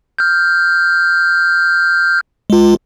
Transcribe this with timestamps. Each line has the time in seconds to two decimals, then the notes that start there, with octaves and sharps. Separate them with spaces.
0.19 F6 G6
2.50 G#3 F4